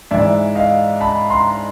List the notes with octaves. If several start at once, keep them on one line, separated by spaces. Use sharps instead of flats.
G#2 E3 D5 E5
D#5 F5
A5 B5
A#5 C6